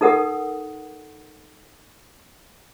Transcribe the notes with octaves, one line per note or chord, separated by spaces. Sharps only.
D#4 A4 A#4 F#5 D#6